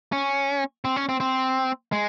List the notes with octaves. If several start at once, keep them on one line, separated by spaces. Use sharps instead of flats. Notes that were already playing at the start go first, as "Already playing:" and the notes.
C#4
C4
C#4
C4
C4
G#3